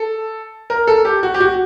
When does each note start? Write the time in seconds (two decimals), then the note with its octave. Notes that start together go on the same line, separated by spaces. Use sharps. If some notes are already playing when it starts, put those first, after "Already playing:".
Already playing: A4
0.70 A#4
0.87 A4
1.05 G4
1.23 F#4
1.34 G4
1.40 F#4